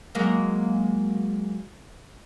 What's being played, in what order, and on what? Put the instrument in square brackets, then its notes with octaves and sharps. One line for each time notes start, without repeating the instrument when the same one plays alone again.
[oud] F#3 G#3 A#3